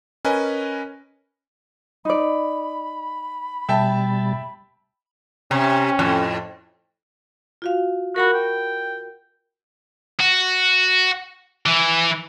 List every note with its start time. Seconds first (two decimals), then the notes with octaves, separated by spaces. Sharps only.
0.25 C#4 A#4 B4 D#5 G#5
2.05 D#4 D5 B5
3.69 B2 G3 E5 G5 A5 A6
5.51 C3 C#4
5.99 F2 A2
7.62 F4 F#4 F5
8.16 F#4 A#4 F#5 B5
8.33 G5
10.20 F#4
11.66 E3